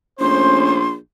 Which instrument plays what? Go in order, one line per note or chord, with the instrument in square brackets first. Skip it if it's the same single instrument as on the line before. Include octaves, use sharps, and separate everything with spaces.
[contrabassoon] A#1 [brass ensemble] A3 C#4 C5 [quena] C6